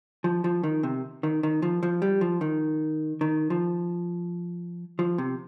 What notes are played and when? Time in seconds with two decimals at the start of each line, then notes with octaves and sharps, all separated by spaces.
0.24 F3
0.44 F3
0.63 D#3
0.83 C3
1.23 D#3
1.43 D#3
1.62 F3
1.83 F3
2.02 G3
2.21 F3
2.41 D#3
3.21 D#3
3.50 F3
4.99 F3
5.18 C3